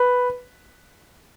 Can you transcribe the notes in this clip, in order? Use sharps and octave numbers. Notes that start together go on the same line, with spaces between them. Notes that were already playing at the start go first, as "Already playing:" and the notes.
Already playing: B4